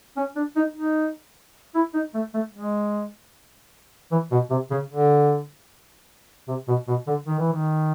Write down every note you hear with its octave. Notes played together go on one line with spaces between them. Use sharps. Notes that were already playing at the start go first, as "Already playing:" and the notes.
C#4
D4
D#4
D#4
E4
D#4
A3
A3
G#3
E3
B2
C3
C#3
D3
C3
B2
B2
D3
D#3
E3
D#3